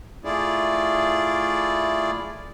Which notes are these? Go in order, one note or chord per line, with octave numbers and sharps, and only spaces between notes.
A3 E4 F4 G#4 D5